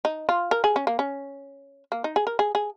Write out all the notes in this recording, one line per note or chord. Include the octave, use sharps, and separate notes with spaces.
D#4
F4
A#4
G#4
C#4
A#3
C#4
A#3
D#4
G#4
A#4
G#4
G#4